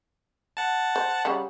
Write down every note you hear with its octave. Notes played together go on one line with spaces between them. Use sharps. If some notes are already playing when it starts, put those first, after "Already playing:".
F#5 A5
C5
C#3 G3 F#5